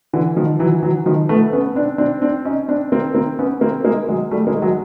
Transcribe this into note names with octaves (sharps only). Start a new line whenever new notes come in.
D3 E3
D#3 F3
E3 F#3
E3 F#3
D#3 F3
A3 B3
B3 C#4
C4 D4
C4 D4
C4 D4
C#4 D#4
C4 D4
A#3 C4
A#3 C4
B3 C#4
A#3 C4
G#3 A#3
F#3 G#3
G3 A3
G#3 A#3
F#3 G#3